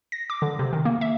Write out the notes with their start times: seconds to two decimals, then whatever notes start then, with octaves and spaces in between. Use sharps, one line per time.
0.12 A#6
0.30 D6
0.42 D3
0.59 C3
0.73 D#3
0.85 A#3
1.01 E5